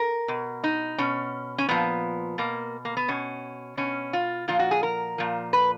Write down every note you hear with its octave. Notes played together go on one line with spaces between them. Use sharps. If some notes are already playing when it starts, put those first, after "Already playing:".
Already playing: A#4
B2
D#4
B2 C#4
C#4
A#2 F3 B3
B2 A#3
A#3
B3
B2 C#4
B2 C#4
F4
A#2 F3 F4
F#4
G#4
A#4
A#2 F3
B4